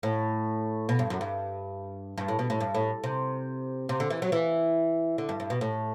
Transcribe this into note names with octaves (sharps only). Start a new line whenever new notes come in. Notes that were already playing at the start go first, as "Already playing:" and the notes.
A2
B2
G2
F#2
G2
G2
A2
B2
A2
G2
A2
C3
C3
D3
E3
F#3
E3
D3
G2
G2
B2
A2